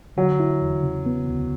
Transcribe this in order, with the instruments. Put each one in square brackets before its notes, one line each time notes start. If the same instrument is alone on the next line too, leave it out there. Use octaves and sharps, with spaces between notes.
[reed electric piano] D3 [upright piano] F#3
[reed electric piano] E4
E2
C#3
B3
D2